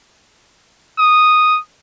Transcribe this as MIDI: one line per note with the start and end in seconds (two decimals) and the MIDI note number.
0.98 1.59 87